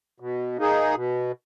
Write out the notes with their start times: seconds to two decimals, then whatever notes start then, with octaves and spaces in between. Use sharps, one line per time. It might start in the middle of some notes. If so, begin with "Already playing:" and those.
0.20 B2
0.58 A#3 D#4 G#4
0.95 B2